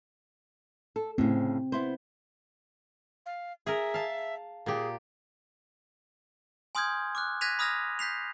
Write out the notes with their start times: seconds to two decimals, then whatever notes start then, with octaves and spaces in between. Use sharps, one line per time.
0.96 A4
1.18 A2 C#3 C4
1.72 B3 E4 C5
3.26 F5
3.67 G#4 A#4 E5
3.94 F5 A5
4.66 A#2 G4 G#4
6.75 G#5 C6 D#6 F6 G6 G#6
7.15 D6 F6 F#6
7.41 F#6 G#6 A#6 B6 D#7 F7
7.59 B5 D#6 F6 G#6 A#6 F7
7.99 G6 B6 C7 F7